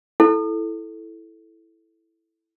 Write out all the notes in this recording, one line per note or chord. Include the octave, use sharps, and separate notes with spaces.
E4 A4